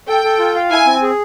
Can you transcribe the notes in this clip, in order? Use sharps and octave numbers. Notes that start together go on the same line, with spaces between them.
A4 G5
A4
F4
F5
E4 G#5
C4
G#4